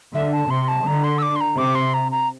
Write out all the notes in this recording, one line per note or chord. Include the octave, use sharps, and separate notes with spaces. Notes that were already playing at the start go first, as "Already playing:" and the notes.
D3 E5
A5
C3 C6
A5
D3 A#5
C6
E6
D6
C6
A#5
C3 D6
C6
A#5
A#5